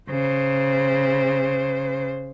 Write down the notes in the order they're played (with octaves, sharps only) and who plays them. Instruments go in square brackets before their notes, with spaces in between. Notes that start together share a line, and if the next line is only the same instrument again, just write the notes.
[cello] C#3 C5